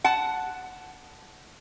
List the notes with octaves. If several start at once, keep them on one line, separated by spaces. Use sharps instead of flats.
F#5 A5